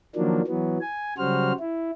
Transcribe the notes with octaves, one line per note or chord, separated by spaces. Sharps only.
D#3 F3 F#3 A#3 D4
E3 F#3 B3
G#5
C#3 F#3 G3 F#4 C5 F6
E4